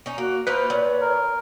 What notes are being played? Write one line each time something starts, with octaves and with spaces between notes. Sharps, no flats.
C#4 D#4
A#3 F#4
A#3 D#4 F4 B4 C5
A#2 C#5
A#4